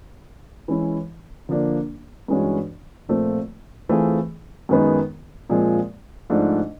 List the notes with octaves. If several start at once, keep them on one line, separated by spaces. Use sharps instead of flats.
E3 G#3 C#4 E4
D3 F3 A#3 D4
G2 E3 G#3 C#4 F#4
A#2 F3 A3 C4
E3 A3 C4 F4 G#4
F#2 D#3 G#3 B3 D#4
A#2 F3 G#3 C4
G#2 F3 A3 D4